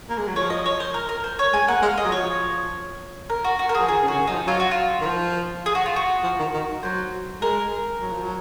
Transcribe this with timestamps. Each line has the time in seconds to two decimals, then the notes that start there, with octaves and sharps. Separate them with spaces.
0.09 A#3
0.18 G#3
0.28 F#3
0.36 F3 C#5
0.50 D#5
0.66 C#5
0.80 C5
0.94 A#4
1.09 A#4
1.24 C5
1.39 C#5
1.53 G#3 G#5
1.68 A#3 F#5
1.82 G#3 F5
1.98 D#5
2.05 F#3
2.12 F3 C#5
3.30 A#4
3.44 F#4
3.59 F#4
3.69 A#4
3.75 F3 G#4
3.88 D#3 G#4
4.03 C#3
4.08 F#4
4.13 C#3
4.19 D#3
4.27 F#3 D#4
4.33 F3
4.47 F#3 F4
4.60 F#4
4.71 F4
5.01 D#3
5.06 F3
5.66 G#4
5.75 F#4
5.86 F4
5.96 F#4
6.24 F3
6.39 D#3
6.54 D#3
6.83 F#3 C5
7.41 G#3 A#4
8.01 F#3
8.12 F3
8.23 F#3